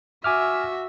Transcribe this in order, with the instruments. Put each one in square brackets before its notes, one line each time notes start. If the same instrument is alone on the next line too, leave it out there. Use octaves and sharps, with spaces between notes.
[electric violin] F#4 E5 [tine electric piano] G#5 D6 F6